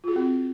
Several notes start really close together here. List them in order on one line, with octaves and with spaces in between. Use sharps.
F4 G#4 F#4 C4